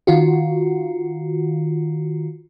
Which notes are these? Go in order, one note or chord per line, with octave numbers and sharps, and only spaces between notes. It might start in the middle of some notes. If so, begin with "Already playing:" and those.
D#3 F4 F#4